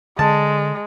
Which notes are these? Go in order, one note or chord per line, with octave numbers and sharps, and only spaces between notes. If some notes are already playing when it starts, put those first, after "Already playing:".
D3 G#3 A5